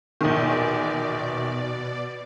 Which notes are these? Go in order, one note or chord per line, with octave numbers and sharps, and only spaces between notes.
A#1 E2 B2 D#3 D5